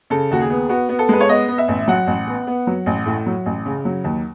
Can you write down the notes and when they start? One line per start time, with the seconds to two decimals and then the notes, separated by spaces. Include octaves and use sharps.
0.10 C#3 A4
0.31 D#2 F#4
0.41 G#4
0.50 B3
0.69 B3 F#4
0.89 B3
0.99 A4
1.09 G#3 B4
1.21 C#5
1.29 B3 D#5
1.48 B3
1.58 E5
1.68 A1
1.87 F#3 F#5
2.07 A1
2.27 B3
2.47 B3
2.67 F#3
2.86 A1
3.06 A2
3.26 F#3
3.46 A1
3.66 C#3
3.85 F#3
4.04 D#2